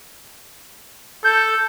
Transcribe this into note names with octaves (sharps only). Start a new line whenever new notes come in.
A4 G6